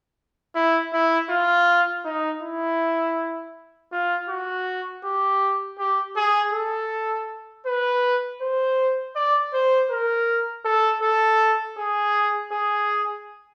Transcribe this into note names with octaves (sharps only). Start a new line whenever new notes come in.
E4
E4
F4
D#4
E4
F4
F#4
G4
G4
G#4
A4
B4
C5
D5
C5
A#4
A4
A4
G#4
G#4